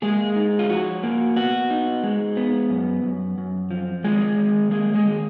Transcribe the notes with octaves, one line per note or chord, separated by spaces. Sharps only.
G#3 A#3 G#4
D#4
F4
F3 F#4
A#3
B3 F#4
D#4
G#3
B3
F#2
F#2
F#2
F3
D#3 G#3 G#4
D#3
G#3 A#3 G#4
G#3 G#4
D#3